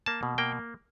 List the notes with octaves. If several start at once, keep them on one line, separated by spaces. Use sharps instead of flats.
A#3 A5
B2
A#3 G5